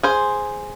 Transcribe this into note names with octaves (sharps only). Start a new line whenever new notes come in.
G#4 C5